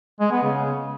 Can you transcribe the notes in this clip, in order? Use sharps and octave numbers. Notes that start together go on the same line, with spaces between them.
G#3
B3
C#3